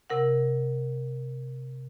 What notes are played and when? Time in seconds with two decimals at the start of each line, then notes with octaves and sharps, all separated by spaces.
0.10 C3 A#4 F#5